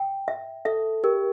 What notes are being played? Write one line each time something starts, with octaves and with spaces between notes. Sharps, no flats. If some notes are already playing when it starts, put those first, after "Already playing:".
Already playing: G5
E5
A4 E5
G4 A#4